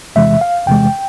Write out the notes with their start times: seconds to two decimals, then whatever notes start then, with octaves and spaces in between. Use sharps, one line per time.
0.15 E2 C3 E3 G#3 E5
0.41 F5
0.67 E2 C3 E3 G#3 G5